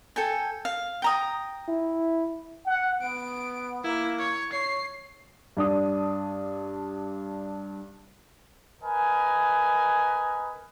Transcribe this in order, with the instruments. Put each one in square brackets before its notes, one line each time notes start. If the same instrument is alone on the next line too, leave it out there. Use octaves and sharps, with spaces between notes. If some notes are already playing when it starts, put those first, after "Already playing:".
[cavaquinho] A4 G5 G#5
F5
G5 A#5 D#6
[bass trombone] E4
[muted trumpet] F#5
[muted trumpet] B3 [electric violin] D7
[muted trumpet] A#3 [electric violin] E4
[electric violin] C#5
[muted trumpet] C#5 [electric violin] C7
[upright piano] G2 D4 D#6
[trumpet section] A#4 B4 D#5 G#5